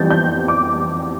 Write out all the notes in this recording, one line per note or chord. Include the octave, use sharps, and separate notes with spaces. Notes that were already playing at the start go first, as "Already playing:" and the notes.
Already playing: F2 E3 G3 G6 A6
G6
D6